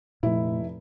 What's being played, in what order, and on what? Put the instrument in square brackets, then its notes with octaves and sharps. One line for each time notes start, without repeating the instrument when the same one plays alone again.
[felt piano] F1 E4 [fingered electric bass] A#2 A3